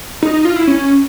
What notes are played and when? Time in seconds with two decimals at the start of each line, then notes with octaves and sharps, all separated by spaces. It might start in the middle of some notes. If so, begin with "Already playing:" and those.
0.23 D#4
0.34 D#4
0.45 F4
0.56 E4
0.67 C#4